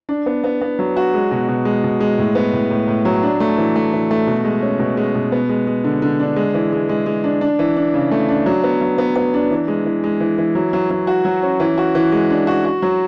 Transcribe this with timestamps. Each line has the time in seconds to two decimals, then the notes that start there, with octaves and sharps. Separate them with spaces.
0.09 D4
0.26 B3
0.44 B3
0.61 B3
0.79 F#3
0.96 F#4
1.14 G#3
1.31 B2
1.48 B2
1.65 G#3
1.84 B2
2.00 G#3
2.18 A2
2.35 B3
2.53 A2
2.70 A2
2.88 A2
3.05 F#3
3.23 D4
3.40 A3
3.58 E3
3.76 A3
3.93 E3
4.11 A3
4.27 B2
4.45 G#3
4.62 C#4
4.80 B2
4.97 G#3
5.15 B2
5.32 B3
5.49 G#3
5.67 G#3
5.84 D3
6.02 D3
6.20 D4
6.36 G#3
6.54 E3
6.72 G#3
6.89 G#3
7.06 G#3
7.24 D4
7.41 D4
7.59 E3
7.77 D4
7.94 C#3
8.11 A3
8.29 D4
8.46 F#3
8.64 B3
8.81 F#3
8.98 B3
9.16 B3
9.34 D4
9.51 E3
9.68 G#3
9.86 E3
10.04 G#3
10.20 E3
10.38 E3
10.55 F#3
10.73 F#3
10.90 F#3
11.07 F#4
11.25 F#3
11.43 C#4
11.60 E3
11.78 F#4
11.95 E3
12.12 G#3
12.30 D4
12.47 F#4
12.65 F#4
12.82 F#3